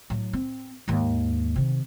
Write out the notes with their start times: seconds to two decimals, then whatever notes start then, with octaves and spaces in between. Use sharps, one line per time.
0.10 A2 F#3
0.33 C4
0.88 D#2 G#2
1.56 C3 D#3